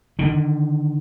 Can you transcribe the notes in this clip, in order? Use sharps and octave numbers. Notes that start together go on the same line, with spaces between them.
D3 D#3